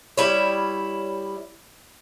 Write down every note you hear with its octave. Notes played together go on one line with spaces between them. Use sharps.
G3 E4 C#5